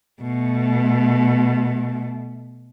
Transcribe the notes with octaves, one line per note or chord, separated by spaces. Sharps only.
B2 A3